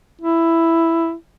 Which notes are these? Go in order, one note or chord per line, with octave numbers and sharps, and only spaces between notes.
E4